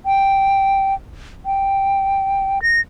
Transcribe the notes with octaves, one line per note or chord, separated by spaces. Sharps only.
G5
G5
A#6